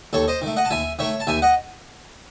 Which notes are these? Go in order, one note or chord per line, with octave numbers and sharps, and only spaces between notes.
D#2 A4 C#5
C5 D#5
D#3 A3
D#5 F#5
A5
D#2 E5 G#5
D#3 A3 C#5 E5
A5
D#2 E5 G#5
D#5 F#5